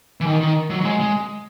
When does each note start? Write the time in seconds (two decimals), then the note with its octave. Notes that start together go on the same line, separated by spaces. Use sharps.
0.21 E3
0.26 D#3
0.41 D#3
0.70 F#3
0.81 F#3
0.85 G#3
1.00 G#3